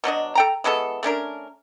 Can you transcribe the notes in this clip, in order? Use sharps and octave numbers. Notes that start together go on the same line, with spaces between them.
B2 F#3 D4 D#5
A4 G5 A#5
E3 G#3 B3 A4
A3 C#4 D4 A#4